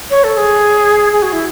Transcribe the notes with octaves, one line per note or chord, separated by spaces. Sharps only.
C#5
A4
G#4
G#4
F#4
E4